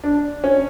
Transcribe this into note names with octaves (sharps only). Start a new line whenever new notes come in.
D4
C#4